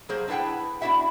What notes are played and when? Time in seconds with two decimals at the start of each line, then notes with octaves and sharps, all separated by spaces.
0.09 F#3 A3 A#3 G#4 C5
0.28 D4 E4 G#4 B4 F#5 G5
0.81 B3 D4 E4 F#4 E5 F#5